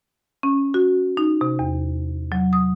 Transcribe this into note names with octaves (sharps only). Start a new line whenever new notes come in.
C#4
F#4
D#4
C3
E2
F#3
D#6